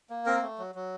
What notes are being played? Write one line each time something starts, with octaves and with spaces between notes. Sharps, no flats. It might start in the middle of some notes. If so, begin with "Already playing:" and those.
A#3
C4 A#4
A3
F#3
F#3